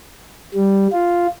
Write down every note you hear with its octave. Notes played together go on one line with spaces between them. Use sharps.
G3
F4